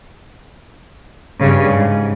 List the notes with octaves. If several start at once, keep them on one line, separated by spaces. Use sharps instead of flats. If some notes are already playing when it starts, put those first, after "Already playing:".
G2 C#3
G#2